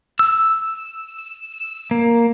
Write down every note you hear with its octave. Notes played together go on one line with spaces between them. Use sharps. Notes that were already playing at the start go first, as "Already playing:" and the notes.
E6
A#3